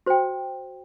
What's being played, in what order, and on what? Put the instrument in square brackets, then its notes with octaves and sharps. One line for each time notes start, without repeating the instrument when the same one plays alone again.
[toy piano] F#4 C5 G5